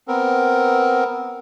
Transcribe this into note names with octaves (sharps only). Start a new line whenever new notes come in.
B3 C4 A#4